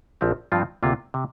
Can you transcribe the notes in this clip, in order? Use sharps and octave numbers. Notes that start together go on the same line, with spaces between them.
A#1 A#2 F3 C4 G4
G2 F3 C4 F4
D2 C3 A#3 F4
C3